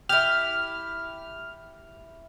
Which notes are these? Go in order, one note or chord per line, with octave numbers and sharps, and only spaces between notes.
E4 G4 F6